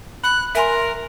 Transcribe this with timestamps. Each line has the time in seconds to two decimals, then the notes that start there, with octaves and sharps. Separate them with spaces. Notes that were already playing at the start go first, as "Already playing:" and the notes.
0.24 B5 F#6
0.55 A#4 E5 G#5 C6